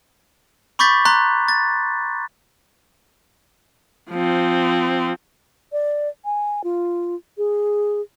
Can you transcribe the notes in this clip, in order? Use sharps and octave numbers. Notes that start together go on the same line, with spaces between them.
B5 C#6 D6 G6 A6 B6
A#5 C6 F#6
A6
F3 C4
D5
G#5
F4
G#4